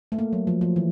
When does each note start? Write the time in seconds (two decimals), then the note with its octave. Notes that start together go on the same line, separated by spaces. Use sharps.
0.12 A3
0.19 A#3
0.33 F#3
0.47 F3
0.61 F3
0.76 E3